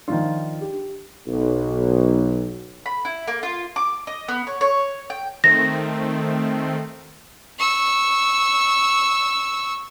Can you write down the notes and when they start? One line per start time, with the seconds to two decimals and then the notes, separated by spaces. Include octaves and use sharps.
0.08 D#3 F3 D4 F4
0.61 G4
1.27 B1
2.86 B5
3.05 E4
3.28 A#3
3.43 F4
3.76 D6
4.07 D#5
4.28 B3
4.47 C#5
4.61 C#5
5.10 G5
5.44 D#3 A3 C4 A#6
7.58 C#6 E6